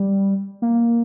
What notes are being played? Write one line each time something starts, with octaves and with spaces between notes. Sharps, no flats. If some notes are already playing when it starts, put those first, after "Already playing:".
Already playing: G3
A#3